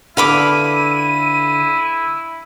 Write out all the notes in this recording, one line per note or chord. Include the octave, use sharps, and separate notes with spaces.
D3 E4 A4 B4 F5 B5 D6 D#7